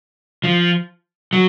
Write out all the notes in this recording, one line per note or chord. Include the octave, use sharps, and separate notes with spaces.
F3
F#3